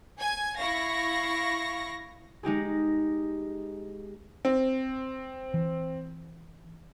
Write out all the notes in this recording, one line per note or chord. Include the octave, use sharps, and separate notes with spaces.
G#5 G#6
E4 F5 C#6 A#6
G#3 D#4 G4 G#4
C4
E3